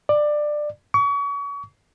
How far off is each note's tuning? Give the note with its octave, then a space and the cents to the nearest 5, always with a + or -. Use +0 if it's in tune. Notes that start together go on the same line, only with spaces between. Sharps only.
D5 +20
C#6 +35